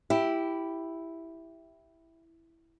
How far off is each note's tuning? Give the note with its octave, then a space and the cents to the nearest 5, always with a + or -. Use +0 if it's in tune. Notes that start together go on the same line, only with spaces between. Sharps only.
E4 +0 G4 +0